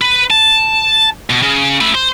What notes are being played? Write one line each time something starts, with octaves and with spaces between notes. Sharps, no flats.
B4
A5
B2
C#3
A3 B4
C5